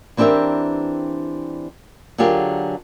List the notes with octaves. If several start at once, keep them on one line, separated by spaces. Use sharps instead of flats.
E3 C4 D4 G4 A#4 E5
D3 F#3 F4 G4 G#4 A#4